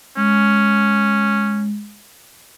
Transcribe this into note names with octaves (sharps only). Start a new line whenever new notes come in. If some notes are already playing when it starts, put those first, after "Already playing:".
G#3 C#4